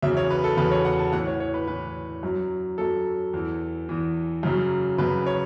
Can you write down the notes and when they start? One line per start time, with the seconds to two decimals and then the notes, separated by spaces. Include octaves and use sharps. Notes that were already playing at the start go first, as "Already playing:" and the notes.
0.02 E2 C#3 F#3 E5
0.17 C#5
0.31 B4
0.44 A4
0.57 E2 C#3 F#3 B4
0.71 C#5
0.85 F#5
0.99 A5
1.13 A2 E3 F#5
1.27 C#5
1.40 C#5
1.54 B4
1.67 A2 E3 B4
2.23 F#2 F#3
2.78 F#2 F#3 A4
3.33 E2 E3
3.89 E2 E3
4.43 F#2 C#3 F#3
4.98 F#2 C#3 F#3 B4
5.26 C#5